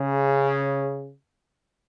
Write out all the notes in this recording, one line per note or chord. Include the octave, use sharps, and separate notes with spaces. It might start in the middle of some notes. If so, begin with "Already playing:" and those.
Already playing: C#3